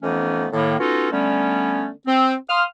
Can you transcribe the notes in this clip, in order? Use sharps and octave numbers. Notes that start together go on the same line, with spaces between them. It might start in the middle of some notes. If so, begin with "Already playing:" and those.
F2 E3 A3 B3 C#4 D#4
A2 D#3 A#3
B3 C#4 D#4 F4 F#4 A4
D3 G3 A3 B3 C#4
C4
F5 C6 D#6 F6